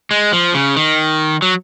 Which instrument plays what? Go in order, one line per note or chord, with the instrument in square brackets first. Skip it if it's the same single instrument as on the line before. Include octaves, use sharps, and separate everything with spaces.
[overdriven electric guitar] G#3
F3
C#3
D#3
F#3